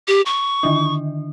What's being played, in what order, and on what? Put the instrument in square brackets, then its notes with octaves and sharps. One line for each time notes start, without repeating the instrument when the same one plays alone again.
[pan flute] G4
C#6
[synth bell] D3 D#3 D4